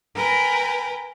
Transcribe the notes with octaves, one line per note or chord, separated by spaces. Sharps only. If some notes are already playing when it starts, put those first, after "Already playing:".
A#4 B4 G5 G#5 A#5